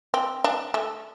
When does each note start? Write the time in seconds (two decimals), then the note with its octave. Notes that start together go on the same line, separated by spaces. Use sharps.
0.14 C4
0.44 D4
0.74 A3